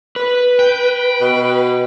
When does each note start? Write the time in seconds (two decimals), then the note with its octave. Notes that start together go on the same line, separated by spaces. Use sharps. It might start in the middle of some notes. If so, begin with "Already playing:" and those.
0.16 B4
0.59 G5
1.21 B2